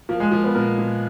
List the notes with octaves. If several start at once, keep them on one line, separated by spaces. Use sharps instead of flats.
F3 A#3
G#3
F3 A#3
B3
A#2 A#4
A#2